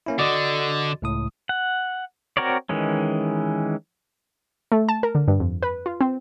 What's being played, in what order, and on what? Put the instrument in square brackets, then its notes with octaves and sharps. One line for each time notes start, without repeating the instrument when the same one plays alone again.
[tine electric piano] A#3 C#4 E4
[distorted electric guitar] D3 [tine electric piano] F#4 D5 D#5
[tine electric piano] C#2 A2 D#6
[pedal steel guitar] F#5
C4 F#4 A#4 C#5 D5
D#3 E3 G#3 C#4
[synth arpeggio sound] A3
A5
A#4
D3
G2
F2
B4
F4
C4